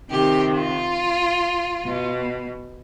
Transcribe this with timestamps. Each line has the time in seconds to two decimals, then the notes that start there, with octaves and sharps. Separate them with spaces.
0.10 C3 D#3 G4
0.54 F4
1.85 B2